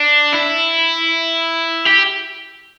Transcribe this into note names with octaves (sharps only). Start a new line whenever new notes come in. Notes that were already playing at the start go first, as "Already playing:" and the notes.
Already playing: D4
E4
G4